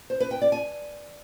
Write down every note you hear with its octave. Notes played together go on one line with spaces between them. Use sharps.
C5
B4
G5
D5
G#5